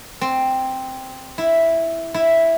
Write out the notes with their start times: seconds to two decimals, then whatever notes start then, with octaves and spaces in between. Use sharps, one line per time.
0.21 C4
1.38 E4
2.14 E4